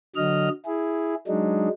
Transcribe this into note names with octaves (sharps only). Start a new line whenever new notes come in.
D3 F#3 D#5 F6
E4 G#4
F#3 G#3 D4 D#4